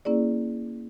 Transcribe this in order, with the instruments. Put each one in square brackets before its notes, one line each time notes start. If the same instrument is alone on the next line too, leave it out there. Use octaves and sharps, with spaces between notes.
[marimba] A#3 C#4 E4 G#4 D5